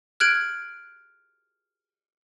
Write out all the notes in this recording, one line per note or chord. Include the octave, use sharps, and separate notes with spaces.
F6 F#6 G#6 D7 F#7